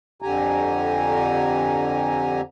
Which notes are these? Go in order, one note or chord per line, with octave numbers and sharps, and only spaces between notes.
F2 D3 G4 G#5 A#5